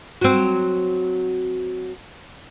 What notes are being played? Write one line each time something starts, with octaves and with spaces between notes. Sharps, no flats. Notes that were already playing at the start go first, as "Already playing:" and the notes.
F#3 C4